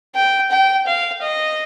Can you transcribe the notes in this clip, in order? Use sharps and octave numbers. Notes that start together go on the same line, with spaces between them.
G5
G5
F5
D#5